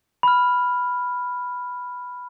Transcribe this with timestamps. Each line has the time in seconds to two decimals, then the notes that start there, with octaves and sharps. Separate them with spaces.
0.23 B5 F6